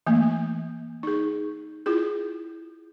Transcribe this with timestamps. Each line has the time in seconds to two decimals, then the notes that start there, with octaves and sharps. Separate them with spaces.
0.06 E3 A3 A#3
1.03 D#4 G#4
1.86 E4 F4 G#4